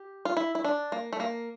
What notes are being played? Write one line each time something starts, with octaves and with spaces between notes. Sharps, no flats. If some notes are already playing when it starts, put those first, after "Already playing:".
Already playing: G4
F4
E4
E4
D4
A#3
A3
A#3